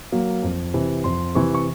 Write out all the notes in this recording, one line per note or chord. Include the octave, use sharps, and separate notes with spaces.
F#3 A#3
F2
C3 E3
F2 C6
C3 E3 C#6
C#6